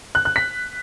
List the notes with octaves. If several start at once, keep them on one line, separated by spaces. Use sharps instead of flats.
F#6
F#6
B6